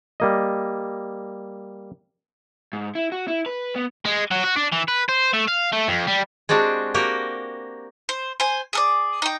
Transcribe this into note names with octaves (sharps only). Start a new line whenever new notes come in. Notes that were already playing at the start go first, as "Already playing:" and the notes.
G3 A#3 D#5
G#2
E4
F#4
E4
B4
B3
G#3
F#3
F#4
D4
E3
B4
C5
A3
F5
A3
F2
G3
G#3 C4 D4 F#4 G4
A#3 F#4 G4 A#4
C5
C5 G#5
G#4 A4 D5
D#4 G5